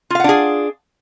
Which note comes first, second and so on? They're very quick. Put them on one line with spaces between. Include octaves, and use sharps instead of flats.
F4 F5 F#5 D4 G#4